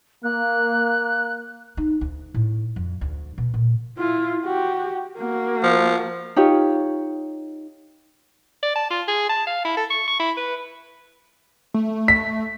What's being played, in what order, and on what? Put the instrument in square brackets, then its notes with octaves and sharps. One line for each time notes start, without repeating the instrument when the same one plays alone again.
[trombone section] A#3 [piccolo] F#6
[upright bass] D#4
D2
A2
F2
D2
B2
A#2
[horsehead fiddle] E4 F4
F#4 G4
A#3 F#4
[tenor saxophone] F3
[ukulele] D#4 F4 G4 C#5
[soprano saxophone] D5
A5
F4
G#4
A5
F5
E4
A4
C#6
C#6
E4
B4
[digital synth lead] A3
[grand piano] B6